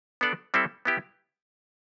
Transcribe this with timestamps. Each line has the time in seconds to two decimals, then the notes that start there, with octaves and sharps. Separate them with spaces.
0.21 B3 D4 A4 D5
0.54 G3 C4 E4 A4
0.85 B3 E4 G4